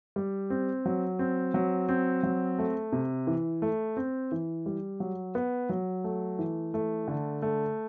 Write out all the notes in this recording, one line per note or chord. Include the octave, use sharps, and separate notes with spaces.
G3
C4
F#3
C4
F#3
C4
F#3
A3
C3
E3
A3
C4
E3
G3
F#3
B3
F#3
A3
E3
A3
D3
A3